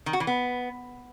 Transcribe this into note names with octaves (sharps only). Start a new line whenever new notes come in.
D#3
F#4
E3
B3